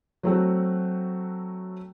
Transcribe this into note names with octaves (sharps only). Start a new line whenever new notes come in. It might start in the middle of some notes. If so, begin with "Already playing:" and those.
F#3 A3 C4 F#4